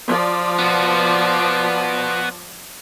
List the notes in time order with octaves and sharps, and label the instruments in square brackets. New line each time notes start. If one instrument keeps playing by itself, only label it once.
[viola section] F3 D5
[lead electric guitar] B3 F#4